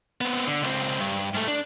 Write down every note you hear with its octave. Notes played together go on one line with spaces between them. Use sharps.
B3 C4
D3
C#2 C4
G2
G#2 A3
D4